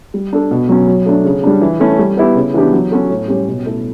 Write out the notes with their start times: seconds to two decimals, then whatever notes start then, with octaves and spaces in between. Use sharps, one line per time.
0.14 G3
0.33 D4 A4
0.51 B2
0.69 F#3 C#4
0.87 F#3
1.06 A3 D4
1.25 C#3
1.44 G3 D4
1.61 E3
1.80 A3 C#4 E4
1.99 G3
2.17 B3 E4 G4
2.35 C#3
2.54 E3 B3 D4 G4
2.73 F#3
2.91 C#4 F#4 A4
3.10 A2
3.28 G3 C#4 G4
3.48 B2
3.65 A3 E4 A4